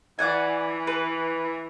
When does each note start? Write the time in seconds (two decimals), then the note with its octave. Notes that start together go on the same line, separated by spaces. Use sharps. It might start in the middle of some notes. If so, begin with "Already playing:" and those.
0.19 E3 D5 F#5 G#5
0.87 B4